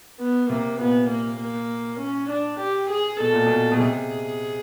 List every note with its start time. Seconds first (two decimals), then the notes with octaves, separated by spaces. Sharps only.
0.20 B3
0.50 C3 A#3
0.79 A#2 B3
1.09 A#3
1.40 A#3
2.00 C#4
2.30 D4
2.60 G4
2.90 G#4
3.20 B2 A4
3.33 A#2
3.46 B2
3.72 B2
3.80 C3 G#4